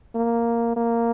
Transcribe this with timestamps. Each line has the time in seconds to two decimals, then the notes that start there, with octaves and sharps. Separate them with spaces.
0.15 A#3
0.77 A#3